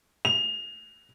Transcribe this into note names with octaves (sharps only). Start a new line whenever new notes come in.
F7